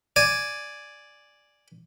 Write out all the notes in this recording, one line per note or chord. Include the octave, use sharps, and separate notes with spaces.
D5 G#5